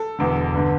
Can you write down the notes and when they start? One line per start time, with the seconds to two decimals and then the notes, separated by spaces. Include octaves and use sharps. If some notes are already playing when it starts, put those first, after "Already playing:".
Already playing: A4
0.19 E1 E2 D3
0.53 G1 D3